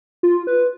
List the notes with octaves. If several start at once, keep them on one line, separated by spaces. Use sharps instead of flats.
F4
B4